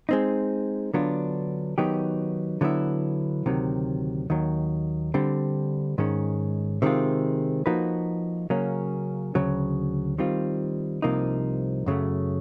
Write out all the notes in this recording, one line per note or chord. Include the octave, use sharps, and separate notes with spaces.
G#3 C4 D#4
D3 F#3 B3 D4 F4
D#3 F#3 B3 D#4 G4
D3 F#3 B3 E4
D2 C3 D#3 F#3
D#2 D#3 F#3
D3 G3 C4
G#2 D#3 G#3 C#4
C3 D#3 G#3 C4 F4
F3 A#3 D#4 F#4 B4
C#3 F#3 A#3 C#4
D2 C#3 F#3
D#3 G3 C4 F4
C2 C3 F3 A#3 D#4
F#2 C#3 F#3 A3